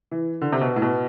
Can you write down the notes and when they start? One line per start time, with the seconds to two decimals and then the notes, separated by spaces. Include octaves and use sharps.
0.11 E3
0.42 D3
0.53 C3
0.61 B2
0.76 A2
0.82 B2